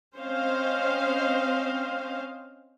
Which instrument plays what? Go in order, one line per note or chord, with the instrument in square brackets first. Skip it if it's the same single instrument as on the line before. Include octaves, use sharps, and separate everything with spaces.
[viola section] C4 C#4 C5 D#5 F5